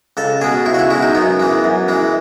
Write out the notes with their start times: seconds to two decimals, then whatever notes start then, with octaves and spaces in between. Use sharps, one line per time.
0.17 C#2 A4
0.41 B2 G#3 G#4
0.66 C#2 E4
0.74 F#4
0.79 E4
0.90 B2 G#3 E4
1.02 D#4
1.15 F#2 B3
1.39 E3 G#3
1.64 F#2
1.88 E3 G#3